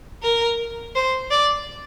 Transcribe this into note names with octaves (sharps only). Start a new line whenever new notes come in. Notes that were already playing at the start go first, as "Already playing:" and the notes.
A#4
C5
D5